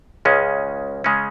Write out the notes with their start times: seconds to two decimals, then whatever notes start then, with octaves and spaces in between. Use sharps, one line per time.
0.25 C#2 C#3 G#3 C#4
1.04 C#3 G#3 C#4